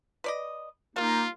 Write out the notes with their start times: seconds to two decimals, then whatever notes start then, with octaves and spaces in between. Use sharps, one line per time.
0.24 B4 D5 D#5
0.96 G3 A#3 D#4 F4